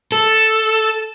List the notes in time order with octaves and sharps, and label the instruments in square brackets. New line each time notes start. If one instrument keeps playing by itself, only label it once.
[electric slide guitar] A4